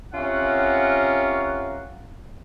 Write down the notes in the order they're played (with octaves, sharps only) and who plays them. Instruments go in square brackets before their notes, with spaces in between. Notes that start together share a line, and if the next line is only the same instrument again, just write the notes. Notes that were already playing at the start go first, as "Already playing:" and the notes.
[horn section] C3 C#4 F4 A#4 F#5